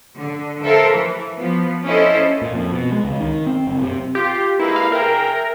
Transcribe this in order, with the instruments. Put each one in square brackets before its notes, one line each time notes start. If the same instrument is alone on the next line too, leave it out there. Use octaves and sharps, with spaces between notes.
[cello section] D3
A4 A#4 C5 E5 F5
E3
F3 B3
C#4 E4 A4 C5 D#5
[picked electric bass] A#2
F2
B2
G#3
C#2
D#3
C4
F#1
C3
[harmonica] F4 [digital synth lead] G4
[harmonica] G#3 A#3 B4 [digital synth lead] E4
[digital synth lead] F5
[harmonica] G#4 E5 G5 [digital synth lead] A#4